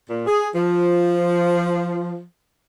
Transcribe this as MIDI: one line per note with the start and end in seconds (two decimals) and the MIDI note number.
0.10 0.24 46
0.26 0.47 68
0.54 2.23 53